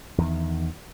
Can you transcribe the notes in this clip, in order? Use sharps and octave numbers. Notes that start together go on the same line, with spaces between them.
E2 D#3